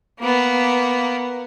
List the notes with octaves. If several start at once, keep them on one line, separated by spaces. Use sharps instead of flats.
A#3 B3